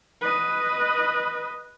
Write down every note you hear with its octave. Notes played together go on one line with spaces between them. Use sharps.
B4 D#5